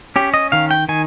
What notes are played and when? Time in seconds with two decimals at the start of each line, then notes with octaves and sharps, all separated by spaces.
0.16 C#4 G4
0.34 D#5
0.52 D#3 F5
0.71 G5
0.89 D#3 G#5